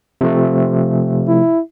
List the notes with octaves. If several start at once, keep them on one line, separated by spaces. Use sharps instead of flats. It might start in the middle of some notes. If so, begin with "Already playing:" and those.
C3 F3 A3
E4